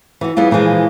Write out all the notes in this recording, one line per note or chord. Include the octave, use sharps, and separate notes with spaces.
E3 F#4
G3 B3 E4 F4 G#4
A#2 E3 F3 G#3 F4